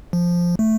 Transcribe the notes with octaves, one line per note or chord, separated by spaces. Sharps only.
F3
A3